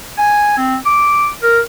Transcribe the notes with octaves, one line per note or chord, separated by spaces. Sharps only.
G#5
C4
D6
A#4